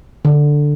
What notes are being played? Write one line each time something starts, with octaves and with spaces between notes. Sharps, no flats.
D3